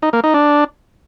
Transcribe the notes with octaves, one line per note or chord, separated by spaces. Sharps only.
D#4
A#3
D#4
D4